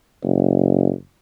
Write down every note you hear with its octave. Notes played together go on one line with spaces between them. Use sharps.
F#1